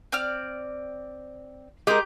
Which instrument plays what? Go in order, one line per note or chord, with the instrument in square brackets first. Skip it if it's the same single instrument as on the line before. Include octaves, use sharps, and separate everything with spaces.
[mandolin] C4 D5 F6
[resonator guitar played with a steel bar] G#3 A#4 [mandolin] G4 D6 G6